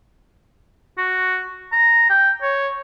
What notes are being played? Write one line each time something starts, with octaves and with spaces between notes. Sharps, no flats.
F#4
A#5
G5
C#5